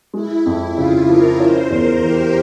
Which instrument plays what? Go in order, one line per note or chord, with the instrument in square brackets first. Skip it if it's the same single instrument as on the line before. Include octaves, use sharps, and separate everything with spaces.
[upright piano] G#3 [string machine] E4
[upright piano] F2
[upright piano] C#3 [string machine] F4
[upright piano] F3 [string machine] A#4
[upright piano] C#4 [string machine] C5
[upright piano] E2 [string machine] A#4
[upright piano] E3 [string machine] G4